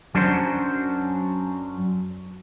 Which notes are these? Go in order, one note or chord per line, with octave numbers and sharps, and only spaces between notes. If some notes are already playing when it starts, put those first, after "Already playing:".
F#2 F#3 C#4 D4 F#4 C5